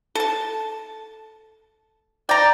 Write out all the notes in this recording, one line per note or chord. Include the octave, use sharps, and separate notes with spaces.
A4 A5
D5 G5 A#5